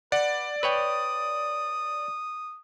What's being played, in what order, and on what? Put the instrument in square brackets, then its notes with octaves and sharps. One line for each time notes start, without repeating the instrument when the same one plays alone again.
[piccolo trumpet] B4 [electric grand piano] D5 [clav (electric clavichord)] F#5
[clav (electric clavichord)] B4 C#5 G5 [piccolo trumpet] D#6